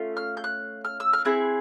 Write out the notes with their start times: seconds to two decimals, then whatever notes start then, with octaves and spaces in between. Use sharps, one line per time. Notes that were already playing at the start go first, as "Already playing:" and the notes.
Already playing: A3 C#4 F4
0.17 F6
0.37 G6
0.44 F#6
0.85 F6
1.00 E6
1.13 F6
1.25 C4 E4 G#4 F#6